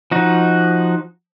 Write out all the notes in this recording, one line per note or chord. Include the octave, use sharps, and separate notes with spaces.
F3 D#4 F#4